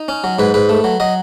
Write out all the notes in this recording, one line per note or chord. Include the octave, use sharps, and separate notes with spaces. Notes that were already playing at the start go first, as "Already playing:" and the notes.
Already playing: D#4
C#4
F#3
G#2 B4
G#2 B4
A3
F#3
F#3 D#5